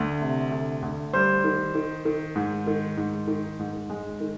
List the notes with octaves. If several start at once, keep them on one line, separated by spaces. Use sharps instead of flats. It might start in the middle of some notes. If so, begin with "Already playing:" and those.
Already playing: D2
C3
D2
D2
G3 C5
D#3
D#3
D#3
G#2
D#3
G#2
D#3
G#2
G#3
D#3